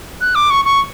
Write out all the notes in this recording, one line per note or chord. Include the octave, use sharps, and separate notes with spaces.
F#6
D6
C#6
C#6